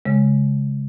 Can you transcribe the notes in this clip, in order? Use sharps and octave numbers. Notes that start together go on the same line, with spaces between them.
C#3 G#3